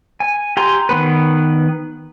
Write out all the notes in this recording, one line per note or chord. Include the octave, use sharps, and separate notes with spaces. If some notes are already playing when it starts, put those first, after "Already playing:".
G#5
G4 G#5 A#5 C6
D#3 B3 B4